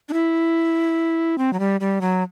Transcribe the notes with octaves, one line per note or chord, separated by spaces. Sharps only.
D4
E4
C4
F#3
G3
G3
F#3